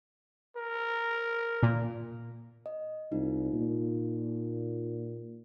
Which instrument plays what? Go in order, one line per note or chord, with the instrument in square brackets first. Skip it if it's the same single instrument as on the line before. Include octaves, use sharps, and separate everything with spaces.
[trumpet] A#4
[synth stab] A#2
[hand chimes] D#5
[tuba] C2 [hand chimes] D#4 F4
[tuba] A#2